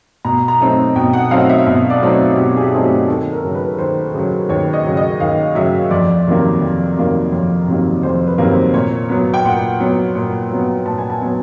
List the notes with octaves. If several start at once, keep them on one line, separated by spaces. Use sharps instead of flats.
B2 A#5
A#5
F#3 A3 C4 D#4
B2 G5
F#5
F#3 A3 C4 D#4 F5
E5
B2 E5
D5
F#3 A3 C4 D#4
C#5
B2 G4
G#4
G4
F#3 A3 C4 D#4
G4
D#2 A4
A#4
C#3 F#3
B4
D#2 C5
C#3 F#3
D#2 C#5
D#5
C#3 F#3
D#5
D#2 F5
C#3 F#3 E5
F2 D5
C3 D#3 F#3 A#3
F2
C3 D#3 F#3 A#3
F2 C#5
C3 D#3 F#3 A#3
F2 C5
B4
C3 D#3 F#3 A#3
C5
A#2 C#5
F#3 B3
G5
A#2 F#5
F#3 B3
A#2
F#3 B3
A#2 A5
G#5
A5
F#3 B3